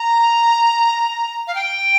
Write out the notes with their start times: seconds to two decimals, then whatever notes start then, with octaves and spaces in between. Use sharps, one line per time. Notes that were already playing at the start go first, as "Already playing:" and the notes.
Already playing: A#5
1.47 F5
1.55 G5